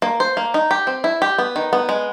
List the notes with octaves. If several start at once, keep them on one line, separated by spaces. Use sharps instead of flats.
A#3
C5
A#3
D#4
G4
C4
E4
G4
B3
D#3
B3
G#3